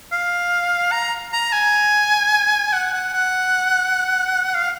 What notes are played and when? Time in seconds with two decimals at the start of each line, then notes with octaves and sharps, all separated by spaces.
0.12 F5
0.92 A#5
1.32 A#5
1.53 G#5
2.72 F#5
2.93 F#5
3.13 F#5
4.54 F5